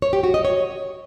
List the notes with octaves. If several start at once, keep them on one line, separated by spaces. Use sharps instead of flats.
C#5
G4
F#4
D#5
C#5